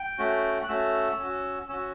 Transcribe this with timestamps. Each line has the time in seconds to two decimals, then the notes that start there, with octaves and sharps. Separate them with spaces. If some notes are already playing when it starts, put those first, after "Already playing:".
Already playing: G5
0.18 A3 C#4 F#4
0.64 F#6
0.69 A3 C#4 F#4 E6
1.19 C#4 F#4
1.69 C#4 F#4 E6